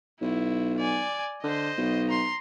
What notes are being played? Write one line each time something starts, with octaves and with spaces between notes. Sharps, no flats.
B1 E4
D5 G#5
D3 C5 D#5
B1
A#5 C6